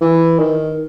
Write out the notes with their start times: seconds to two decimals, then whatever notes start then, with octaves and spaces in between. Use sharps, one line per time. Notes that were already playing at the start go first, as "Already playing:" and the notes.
0.01 E3
0.39 D#3